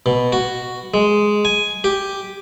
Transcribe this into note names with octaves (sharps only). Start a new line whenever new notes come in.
B2
F#4
G#3
G#5
G4